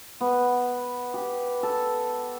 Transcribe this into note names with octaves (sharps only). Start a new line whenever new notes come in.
B3
G4
A4